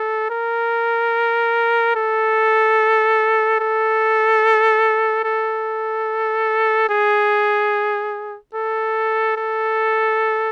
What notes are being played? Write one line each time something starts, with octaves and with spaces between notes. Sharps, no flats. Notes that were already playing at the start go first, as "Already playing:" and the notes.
Already playing: A4
A#4
A4
A4
A4
G#4
A4
A4